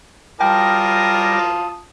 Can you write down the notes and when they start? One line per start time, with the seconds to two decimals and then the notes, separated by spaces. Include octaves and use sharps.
0.41 G3 F4 A#4 G5 A5 D6 D#6 A#6